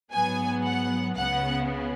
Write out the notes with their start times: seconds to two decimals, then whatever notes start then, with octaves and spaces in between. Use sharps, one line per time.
0.13 G#2 F#3 B3 G#5
0.65 F#5
1.17 C#2 C#3 B3 F#5